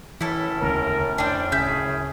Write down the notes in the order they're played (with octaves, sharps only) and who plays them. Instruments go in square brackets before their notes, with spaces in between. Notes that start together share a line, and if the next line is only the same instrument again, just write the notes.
[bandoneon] F#2 A2 C#4 [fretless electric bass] E3 [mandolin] E4 A4
[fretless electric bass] E1 D2 C#3 [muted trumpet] A#4
[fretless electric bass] F1 [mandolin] C4 D4 [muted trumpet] G5
[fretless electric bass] D1 C#3 [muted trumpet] G#4 [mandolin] E5 G6